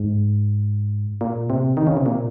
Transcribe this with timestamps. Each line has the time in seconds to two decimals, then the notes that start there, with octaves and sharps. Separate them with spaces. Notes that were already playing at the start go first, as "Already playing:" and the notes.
Already playing: G#2
1.21 A#2
1.50 C3
1.77 D#3
1.87 C#3
1.97 C3
2.06 A#2